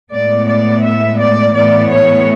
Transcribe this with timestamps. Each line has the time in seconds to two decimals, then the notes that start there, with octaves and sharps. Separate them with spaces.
0.12 A2 G#3 B3 D5
0.48 D5
0.84 E5
1.19 D5
1.54 A2 E3 B3 D5
1.90 C#5